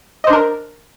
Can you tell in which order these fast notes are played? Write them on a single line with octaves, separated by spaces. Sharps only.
D#5 C5 D4 A#4